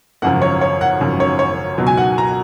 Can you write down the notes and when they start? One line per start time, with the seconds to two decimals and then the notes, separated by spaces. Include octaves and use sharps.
0.22 G#1 F#2 C#3 F3 F#5
0.42 C#5
0.61 C#5
0.81 F#5
1.01 G#1 F#2 C#3 F3
1.20 C#5
1.39 C#5
1.78 C#2 B2 F#3
1.87 G#5
1.98 F#5
2.18 A#5